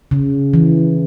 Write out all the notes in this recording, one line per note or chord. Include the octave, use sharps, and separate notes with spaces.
C#3
E3